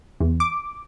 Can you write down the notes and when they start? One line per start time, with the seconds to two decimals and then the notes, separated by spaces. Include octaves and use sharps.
0.20 E2
0.40 D6